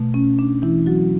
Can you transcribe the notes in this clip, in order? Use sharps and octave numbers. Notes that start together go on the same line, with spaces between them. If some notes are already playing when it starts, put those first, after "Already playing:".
Already playing: B2 A3
C#4
D4
E3 E4
F#3 F#4